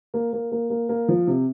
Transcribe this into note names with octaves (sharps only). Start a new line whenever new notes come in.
A#3
A#3
A#3
A#3
A#3
F3
C3